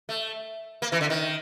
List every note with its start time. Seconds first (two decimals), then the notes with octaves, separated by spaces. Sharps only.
0.09 A3
0.82 A#3
0.92 E3
1.01 D3
1.10 D#3